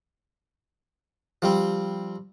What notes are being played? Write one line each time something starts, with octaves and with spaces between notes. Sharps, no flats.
F3 G3 C4